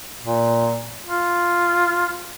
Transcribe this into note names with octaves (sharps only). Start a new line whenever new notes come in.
A#2
F4